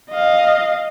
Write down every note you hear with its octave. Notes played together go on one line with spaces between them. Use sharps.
D#5 F5